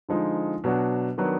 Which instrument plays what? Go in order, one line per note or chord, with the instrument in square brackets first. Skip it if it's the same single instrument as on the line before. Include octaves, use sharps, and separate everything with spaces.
[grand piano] D3 F3 G#3 D#4
B2 F#3 D4 F#4
D#3 F#3 B3 D4